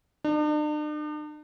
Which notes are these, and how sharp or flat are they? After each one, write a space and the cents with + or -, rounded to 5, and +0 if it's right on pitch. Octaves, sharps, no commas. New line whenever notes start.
D4 +45